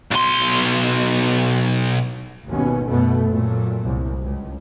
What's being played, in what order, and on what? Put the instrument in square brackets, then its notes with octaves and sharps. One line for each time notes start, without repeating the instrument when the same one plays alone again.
[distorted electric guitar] B1 C6
[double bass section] G#1 D#2 B2 C#4
F#2 B2 A3 B3
A#2 F#3 A3
C2
C#2